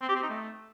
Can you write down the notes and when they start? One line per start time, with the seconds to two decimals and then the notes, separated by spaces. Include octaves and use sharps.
0.02 C4
0.09 G4
0.16 C4
0.23 D#4
0.30 A3